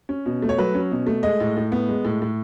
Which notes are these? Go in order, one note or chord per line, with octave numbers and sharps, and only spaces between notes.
C#4
B2
A3
C#5
F#3 B4
C#4
B2
A3
G#3 D#5
A2
A2
B3
G#3
A2
A2